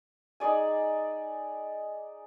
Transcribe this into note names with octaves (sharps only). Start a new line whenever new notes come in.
D#4 G#4 D5 G#5